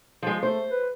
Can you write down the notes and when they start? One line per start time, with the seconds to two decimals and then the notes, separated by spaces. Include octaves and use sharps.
0.23 F3 G#3
0.43 A3 C5
0.71 B4